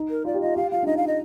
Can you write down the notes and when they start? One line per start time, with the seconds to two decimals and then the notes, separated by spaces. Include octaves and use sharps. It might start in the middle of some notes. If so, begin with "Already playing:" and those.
Already playing: D#4
0.10 A#4
0.25 F4 D5
0.34 G4
0.41 F4 D#5
0.56 G4 F5
0.71 F4 F5
0.83 D4
0.87 D#4 D#5
0.97 F5
1.07 D#5